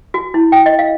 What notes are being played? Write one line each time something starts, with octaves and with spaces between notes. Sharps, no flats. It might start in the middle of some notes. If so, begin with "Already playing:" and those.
F#4
E4
G5
D#5
F5